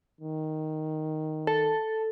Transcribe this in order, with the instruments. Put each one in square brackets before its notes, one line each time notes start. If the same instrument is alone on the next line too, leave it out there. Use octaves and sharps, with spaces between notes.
[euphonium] D#3
[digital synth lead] A4